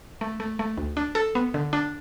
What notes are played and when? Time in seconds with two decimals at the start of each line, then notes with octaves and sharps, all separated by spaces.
0.21 A3
0.40 A3
0.59 A3
0.78 D2
0.97 D4
1.15 A4
1.35 B3
1.54 D3
1.73 D4